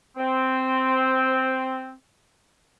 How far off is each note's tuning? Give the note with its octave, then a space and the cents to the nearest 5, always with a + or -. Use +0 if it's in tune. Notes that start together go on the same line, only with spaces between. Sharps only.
C4 -5